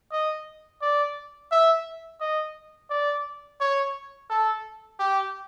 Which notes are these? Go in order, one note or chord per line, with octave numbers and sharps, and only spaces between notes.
D#5
D5
E5
D#5
D5
C#5
A4
G4